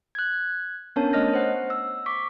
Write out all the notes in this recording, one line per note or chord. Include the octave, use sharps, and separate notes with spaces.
F#6 G#6
B3 C#4 D4 A#4 C#5 A5
A3 C#5 D#5 F6 A#6
C5 F#5
E6
C#6 D6 B6